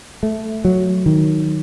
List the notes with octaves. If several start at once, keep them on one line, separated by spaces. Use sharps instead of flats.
A3
F#3
D#3